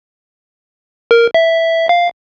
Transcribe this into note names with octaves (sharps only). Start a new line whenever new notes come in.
A#4
E5
F5